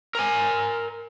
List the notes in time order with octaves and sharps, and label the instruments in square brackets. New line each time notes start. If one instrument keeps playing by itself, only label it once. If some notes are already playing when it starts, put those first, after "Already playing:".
[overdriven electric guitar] A#4 G#5